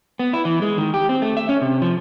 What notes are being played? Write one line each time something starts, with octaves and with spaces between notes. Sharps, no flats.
B3
E4
E3
G#3
D#3
G4
C4
A3
E5
C#4
C3
F3